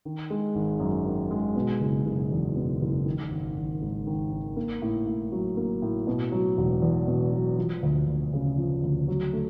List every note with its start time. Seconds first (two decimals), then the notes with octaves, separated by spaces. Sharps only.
0.05 D#3
0.30 G#3
0.55 G#1
0.80 F#2
1.05 D#3
1.31 G#3
1.56 B2
1.81 F#1
2.06 F#1
2.31 E2
2.56 B2
2.81 F#1
3.05 D#3
3.31 G#1
3.56 G#1
3.82 G#2
4.07 D#3
4.32 G#1
4.56 A#3
4.82 A2
5.07 A2
5.32 F#3
5.57 A#3
5.82 A2
6.07 B2
6.32 F#3
6.57 E1
6.82 E2
7.07 B2
7.32 F#3
7.58 F3
7.83 D2
8.08 D2
8.33 C#3
8.58 F3
8.83 D2
9.08 F#3
9.33 A3